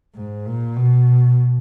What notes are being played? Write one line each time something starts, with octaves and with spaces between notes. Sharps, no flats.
G#2
A#2
B2